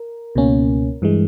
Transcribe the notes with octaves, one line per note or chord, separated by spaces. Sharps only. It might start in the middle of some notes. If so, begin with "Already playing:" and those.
Already playing: A#4
C#2 B2 A#3 C#4
G2 E3 G#3